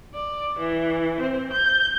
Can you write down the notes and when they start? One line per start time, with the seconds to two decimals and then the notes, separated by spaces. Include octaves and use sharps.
0.14 D5
0.59 E3
1.20 C4
1.52 G6